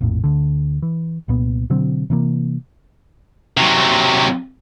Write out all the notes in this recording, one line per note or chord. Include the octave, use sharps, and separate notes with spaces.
A#1 F2 A2
D2 D3
E3
C2 A#2 B3
B2 D3 F#3 C4
C3 E3 A#3
C3 F#3